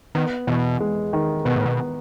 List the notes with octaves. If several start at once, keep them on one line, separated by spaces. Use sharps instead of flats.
D#3 B3
E2 B2
G#3
D#3
B2 B3
A2
B2